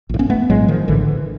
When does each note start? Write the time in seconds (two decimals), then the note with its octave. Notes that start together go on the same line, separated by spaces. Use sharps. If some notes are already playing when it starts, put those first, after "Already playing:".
0.09 A#1 A2
0.19 B3 C#4
0.30 A3 B3
0.50 A#1 A2 F#3 G#3
0.68 D#3 F3
0.88 A#1 A2 D3 E3